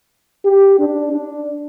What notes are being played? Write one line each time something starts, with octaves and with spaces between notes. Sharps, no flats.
G4
D4
D4